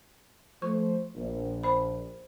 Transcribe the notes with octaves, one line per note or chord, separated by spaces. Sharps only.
F3 A3 C5 C#6
A#1
C5 B5